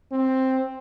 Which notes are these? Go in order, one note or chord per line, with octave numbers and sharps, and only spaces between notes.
C4